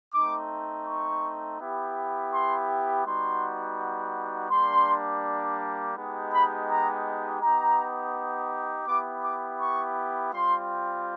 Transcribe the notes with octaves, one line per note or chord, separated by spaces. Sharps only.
A3 C4 D#4 D6
C#6
B3 E4 G4
C6
G3 B3 D#4 F#4 C6
G3 A#3 D4 C6
G#3 B3 D#4 G4
B5
A#5
B3 D#4 G4 A#5
B3 E4 G4 D6
D6
C#6
G3 C4 F4 C6